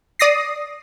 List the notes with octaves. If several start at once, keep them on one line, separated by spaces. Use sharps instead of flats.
D5 D#6 A#6 C7